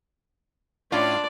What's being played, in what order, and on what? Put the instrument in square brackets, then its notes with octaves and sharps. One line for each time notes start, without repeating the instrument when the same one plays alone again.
[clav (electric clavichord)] A2 C#4 [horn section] D4 [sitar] F4 [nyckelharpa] D5